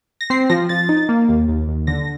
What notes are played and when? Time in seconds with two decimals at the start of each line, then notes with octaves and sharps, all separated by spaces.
0.21 A#6
0.30 C4 C7
0.50 F3 A#6
0.69 F3 A6
0.89 D#4
1.09 A#3
1.29 D#2
1.49 D#2
1.68 D#2
1.87 D3 A#6